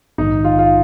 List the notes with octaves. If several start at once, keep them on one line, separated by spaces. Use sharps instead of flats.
A#1 G#2 D#3 D#4
F4
F4